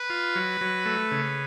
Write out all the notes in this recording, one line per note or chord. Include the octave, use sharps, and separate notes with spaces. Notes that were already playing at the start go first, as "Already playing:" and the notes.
Already playing: B4
F4
F#3
F#3
A3
C#3